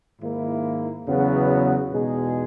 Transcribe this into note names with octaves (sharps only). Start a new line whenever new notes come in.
G#2 D#3 A#3 E4
E2 C#3 F#3 B3 F#4
E2 B2 G#3 D#4 G#4